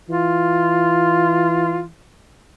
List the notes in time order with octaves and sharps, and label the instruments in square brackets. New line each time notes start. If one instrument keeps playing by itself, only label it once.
[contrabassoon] E3 [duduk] F4